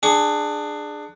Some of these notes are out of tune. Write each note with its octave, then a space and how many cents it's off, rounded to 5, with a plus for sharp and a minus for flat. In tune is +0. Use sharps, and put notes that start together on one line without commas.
D4 +20 G#4 +0 C#6 +25